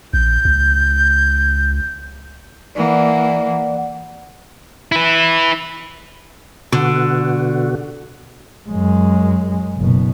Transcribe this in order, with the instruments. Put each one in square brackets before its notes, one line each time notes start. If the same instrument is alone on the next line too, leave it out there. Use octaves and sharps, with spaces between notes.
[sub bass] A#1 [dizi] G6
[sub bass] C#2
[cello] E3 A#3 [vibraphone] D5 F#5
[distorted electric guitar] E4 B4
[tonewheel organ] B2 F#4 [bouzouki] D3
[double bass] F#2 G#3
F#1 B2